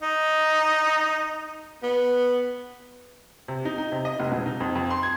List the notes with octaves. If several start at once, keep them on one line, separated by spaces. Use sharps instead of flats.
D#4
B3
C3
D#4
D#4
C3
D#5
F1
E1
D#4
F2
F2
C6
G#6